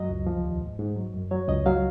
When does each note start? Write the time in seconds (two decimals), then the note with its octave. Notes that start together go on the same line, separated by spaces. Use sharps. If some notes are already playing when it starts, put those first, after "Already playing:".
Already playing: F#2 F#3 D#5
0.09 C#2
0.27 F3
0.44 D#2
0.62 G#2
0.79 G#2
0.97 F#3
1.14 F#2
1.31 F#3 C#5
1.48 C#2 D#5
1.66 F#3 F5